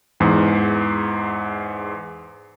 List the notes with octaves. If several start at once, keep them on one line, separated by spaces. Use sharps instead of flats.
E2 G#2